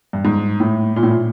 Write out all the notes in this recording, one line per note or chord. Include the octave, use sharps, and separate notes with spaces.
G2
G#2
A2
A#2
A2
A#2